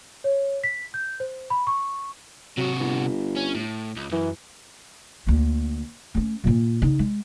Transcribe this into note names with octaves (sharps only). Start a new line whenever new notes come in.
C#5
B6
G6
C5
B5
C#6
C3 F#3 F#4
G1
C#4
A2
C#2
F#2 E3
D2 A#3
A3 C#4
D1 A#2
C#3 D#4
G#3